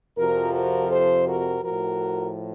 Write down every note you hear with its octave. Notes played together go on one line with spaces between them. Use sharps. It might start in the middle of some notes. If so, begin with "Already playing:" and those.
F2 C3 F3 F#4 A#4
F#4 A#4
A4 C5
F#4 A#4
A2 F3 F#4 A#4